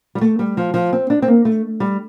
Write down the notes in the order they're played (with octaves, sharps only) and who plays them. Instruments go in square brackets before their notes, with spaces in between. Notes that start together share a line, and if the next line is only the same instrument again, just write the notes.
[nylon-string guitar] G3
A3
G3
F3
F3
C4
D4
C4
A#3
A3
G3